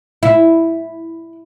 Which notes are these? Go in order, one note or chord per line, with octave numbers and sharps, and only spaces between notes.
E4